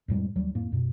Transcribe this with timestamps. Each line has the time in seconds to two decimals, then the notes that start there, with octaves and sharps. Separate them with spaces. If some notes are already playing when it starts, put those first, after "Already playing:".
0.08 F2 A2 G3 G#3
0.35 D#2 F#3 G3
0.55 F2 A2 A#3
0.72 F#2 B2